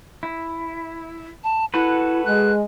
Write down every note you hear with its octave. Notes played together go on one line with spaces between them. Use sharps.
E4
A5
E4 F#4 A4 B4
G#3 F#6